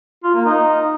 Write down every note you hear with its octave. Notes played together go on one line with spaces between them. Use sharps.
F4
A#3
D#4